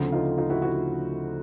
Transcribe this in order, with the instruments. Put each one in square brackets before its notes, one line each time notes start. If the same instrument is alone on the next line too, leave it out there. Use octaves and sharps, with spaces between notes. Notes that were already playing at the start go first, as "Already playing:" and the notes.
Already playing: [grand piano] D2 C#3 F3 A3 C4
[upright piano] D#4 F4
D#4 F4
E4 F#4
E4 F#4